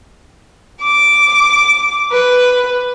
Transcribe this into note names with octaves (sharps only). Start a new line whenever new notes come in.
D6
B4